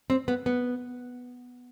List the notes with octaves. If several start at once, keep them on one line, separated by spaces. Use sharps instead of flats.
C4
B3
B3